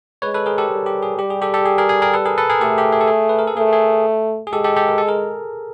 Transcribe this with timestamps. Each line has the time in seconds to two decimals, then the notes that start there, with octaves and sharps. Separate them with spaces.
0.22 G#3 B4 C#5
0.34 A4 B4
0.46 G#4 A#4
0.58 G4 A4
0.70 G3
0.86 G4
1.03 G#4
1.18 G3 G4
1.30 G#4
1.42 G4 A4
1.54 G4 A4
1.65 G#4
1.78 G#4 A#4
1.89 G#4
2.02 G#4 A#4
2.14 A4 B4
2.25 G#4 A#4
2.38 A4 B4
2.50 G#4 A#4
2.61 A3 G4 A4
2.78 G4
2.93 G#4
3.01 A4
3.08 G#4
3.29 B4
3.39 A#4
3.47 A4
3.57 A3 G#4
3.73 G#4
4.47 G#4
4.52 G#3 G4 A4
4.64 G4 A4
4.76 G4 A4
4.88 A#4
4.98 A4
5.08 G#4 A#4